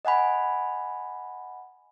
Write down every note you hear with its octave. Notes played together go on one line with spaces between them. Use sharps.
D#5 F#5 G#5 B5